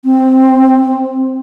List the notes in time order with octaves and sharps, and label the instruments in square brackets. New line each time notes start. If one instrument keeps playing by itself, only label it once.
[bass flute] C4